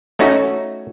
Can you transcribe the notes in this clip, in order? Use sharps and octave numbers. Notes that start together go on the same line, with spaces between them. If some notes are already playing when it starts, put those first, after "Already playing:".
A3 C#4 D#4 F#4